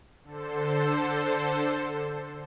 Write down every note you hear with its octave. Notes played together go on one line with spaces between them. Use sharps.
D3 A4 C5